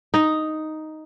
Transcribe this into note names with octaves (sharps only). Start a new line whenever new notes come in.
D#4